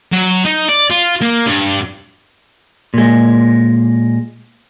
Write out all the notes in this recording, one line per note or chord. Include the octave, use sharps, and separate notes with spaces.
F#3
D#4
D5
F4
A#3
G2
A#2 G#3